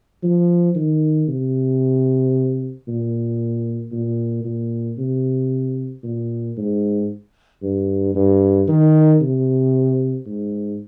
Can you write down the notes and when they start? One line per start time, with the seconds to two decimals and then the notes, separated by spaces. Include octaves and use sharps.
0.23 F3
0.75 D#3
1.28 C3
2.87 A#2
3.92 A#2
4.45 A#2
4.98 C3
6.04 A#2
6.57 G#2
7.63 G2
8.15 G2
8.68 D#3
9.21 C3
10.26 G#2